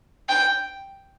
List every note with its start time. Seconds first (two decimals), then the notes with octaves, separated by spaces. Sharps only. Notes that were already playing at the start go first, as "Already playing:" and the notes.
0.29 G5